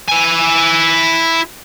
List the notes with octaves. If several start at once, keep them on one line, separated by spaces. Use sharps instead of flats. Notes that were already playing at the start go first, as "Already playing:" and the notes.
E4 G#5